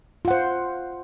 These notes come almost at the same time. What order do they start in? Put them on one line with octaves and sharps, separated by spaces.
F4 F#5 C5